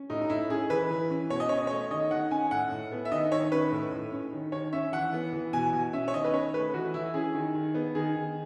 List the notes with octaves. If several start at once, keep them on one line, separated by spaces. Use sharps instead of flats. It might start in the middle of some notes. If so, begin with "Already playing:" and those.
Already playing: C#4
A2 D#4
D#4
A2 E4
C#4 G#4
E3 B4
E3
C#4
B2 C#5
D#5
C#4 C#5
D#5
A3 C#5
D#3 D#5
D#3 F#5
C#4 G#5
A2 F#5
A2
B3
E5
D#3 D#5
D#3 C#5
C#4 B4
A2
A2
C#4
D#3
D#3 C#5
C#4 E5
E3 F#5
B3
E3
B2 G#5
B2
C#4 E5
C#5
D#3 D#5
B4
C#4 C#5
A3 B4
E3 F#4
E3 E4
C#4 G#4
D#3
D#3
B3
D#3 G#4
D#3